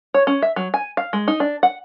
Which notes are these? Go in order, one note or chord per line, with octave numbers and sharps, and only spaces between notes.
C#5
C#4
E5
F#3
G#5
F5
G#3
D#4
D4
F#5